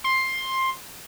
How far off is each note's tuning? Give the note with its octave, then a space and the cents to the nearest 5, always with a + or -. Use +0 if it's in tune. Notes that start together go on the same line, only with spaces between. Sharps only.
C6 +15